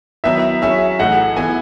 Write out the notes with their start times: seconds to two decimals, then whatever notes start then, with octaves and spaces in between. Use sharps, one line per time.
0.24 D#3 F#3 B3 E4 E5
0.62 F#3 C#4 G#4 E5
0.99 A2 E3 A3 D#4 G#4 F#5
1.36 E3 B3 E4 G#4 G#5